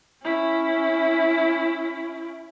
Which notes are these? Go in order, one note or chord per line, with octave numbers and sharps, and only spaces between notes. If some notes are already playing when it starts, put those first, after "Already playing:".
C#4 E4